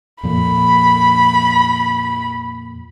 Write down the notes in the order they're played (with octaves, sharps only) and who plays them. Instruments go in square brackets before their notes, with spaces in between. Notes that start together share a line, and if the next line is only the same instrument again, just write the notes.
[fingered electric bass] F2 A#2 F3 [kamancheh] B5